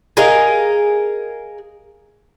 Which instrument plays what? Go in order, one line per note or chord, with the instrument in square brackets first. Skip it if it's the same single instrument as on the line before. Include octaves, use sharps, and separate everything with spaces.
[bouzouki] G#4 A#4 D#5 F5